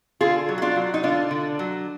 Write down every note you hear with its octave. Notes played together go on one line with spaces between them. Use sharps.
D3 F4 G#4
F#3
F#4
D4 F4
F#3
D#4
D3 D4 F4
D3
F#3